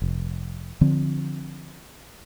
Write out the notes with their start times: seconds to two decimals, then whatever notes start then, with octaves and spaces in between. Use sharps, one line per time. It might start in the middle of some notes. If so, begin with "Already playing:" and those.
0.02 F1
0.81 D3 F3 C4